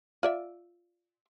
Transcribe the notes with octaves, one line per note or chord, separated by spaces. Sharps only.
F4 D5 E5